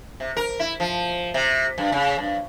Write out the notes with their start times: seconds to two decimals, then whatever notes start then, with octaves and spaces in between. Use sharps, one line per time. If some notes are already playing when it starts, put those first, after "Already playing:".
0.20 C3
0.37 A#4
0.60 E4
0.80 F3
1.34 C3
1.78 G2
1.92 C#3
2.18 G2